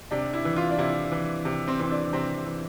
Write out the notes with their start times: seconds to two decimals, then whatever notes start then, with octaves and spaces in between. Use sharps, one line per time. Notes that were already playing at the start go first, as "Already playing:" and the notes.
0.11 C3 D4
0.33 E4
0.45 E3
0.56 F4
0.70 D4
0.78 C3 E4
1.12 E3
1.45 C3
1.68 C4
1.80 E3 C4
1.91 D4
2.13 C3 C4
2.46 E3